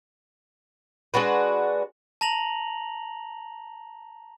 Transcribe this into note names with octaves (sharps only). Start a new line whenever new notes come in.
G#3 D4 F#4 B4
A5 A#5 A#6 F7 F#7